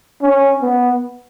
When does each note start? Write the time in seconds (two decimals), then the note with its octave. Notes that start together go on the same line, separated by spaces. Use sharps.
0.22 C#4
0.62 B3